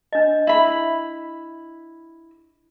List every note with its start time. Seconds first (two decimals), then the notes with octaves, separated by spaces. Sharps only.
0.12 D4 D#5
0.47 E4 B5